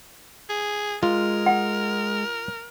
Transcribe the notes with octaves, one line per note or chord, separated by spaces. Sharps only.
G#4
G#3 F4 A#4
F#5